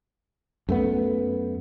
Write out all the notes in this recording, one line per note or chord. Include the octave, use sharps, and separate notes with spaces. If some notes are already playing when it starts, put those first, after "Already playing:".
F#2 A3 B3